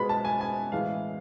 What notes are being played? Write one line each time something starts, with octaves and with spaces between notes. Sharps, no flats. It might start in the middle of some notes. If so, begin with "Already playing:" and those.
Already playing: B2 G#3 B3 B5
A5
G#5
G#5
A2 E3 G#3 F5